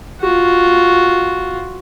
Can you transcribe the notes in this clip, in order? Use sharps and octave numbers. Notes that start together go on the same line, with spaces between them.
F4 F#4